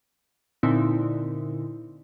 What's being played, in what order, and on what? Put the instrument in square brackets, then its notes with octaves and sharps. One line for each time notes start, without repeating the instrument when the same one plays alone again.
[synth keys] A#2 D3 C4 D#4 E4